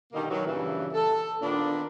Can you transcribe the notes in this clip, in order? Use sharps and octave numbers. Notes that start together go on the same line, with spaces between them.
B2 D3 D#3 G3 A#3 D#4
B2 D#3 E3 F#3
G2 A#2 C#3 E3
A4
A#2 D#3 B3 D4